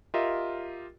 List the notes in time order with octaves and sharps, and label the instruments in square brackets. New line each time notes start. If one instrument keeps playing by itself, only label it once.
[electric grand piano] F4 G4 A#4 D#5 E5